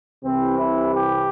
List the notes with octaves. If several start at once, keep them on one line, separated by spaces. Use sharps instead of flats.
C2 C3 E3 C4
E4
G4